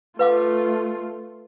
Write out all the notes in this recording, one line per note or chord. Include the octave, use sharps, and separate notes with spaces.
A3 F4 B4 F5 D6